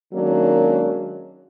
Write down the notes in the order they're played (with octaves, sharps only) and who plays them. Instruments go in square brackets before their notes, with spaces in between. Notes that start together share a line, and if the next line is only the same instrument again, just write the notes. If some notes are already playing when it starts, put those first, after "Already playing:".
[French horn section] D#3 F#3 G#3 A#3 C#4 D4